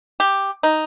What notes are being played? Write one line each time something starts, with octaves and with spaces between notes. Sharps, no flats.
G4
D#4